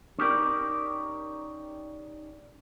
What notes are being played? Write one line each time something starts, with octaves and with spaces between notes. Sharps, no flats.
C#4 D#4 G4 A#4 D5